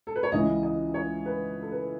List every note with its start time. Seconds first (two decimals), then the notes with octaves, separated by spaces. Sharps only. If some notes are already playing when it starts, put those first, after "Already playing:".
0.07 A4
0.16 B4
0.23 C#5
0.32 C#2 C#3 E3 D#5
0.63 D#5
0.94 C#5
1.26 B4
1.62 A4
1.72 B4